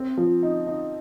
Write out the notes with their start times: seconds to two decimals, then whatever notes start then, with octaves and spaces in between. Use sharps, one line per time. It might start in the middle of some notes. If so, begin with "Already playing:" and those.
Already playing: C4
0.17 F3
0.43 D#4
0.67 D#4